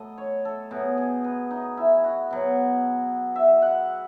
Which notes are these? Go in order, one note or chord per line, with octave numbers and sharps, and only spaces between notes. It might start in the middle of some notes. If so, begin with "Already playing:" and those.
Already playing: A2 F#3 A4 D#5
C#5
A4
B2 F#3 G#4
G#4
B4
D#4
E4
F#4
B2 F#3
E5
F#5